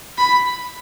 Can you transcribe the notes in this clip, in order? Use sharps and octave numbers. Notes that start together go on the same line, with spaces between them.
B5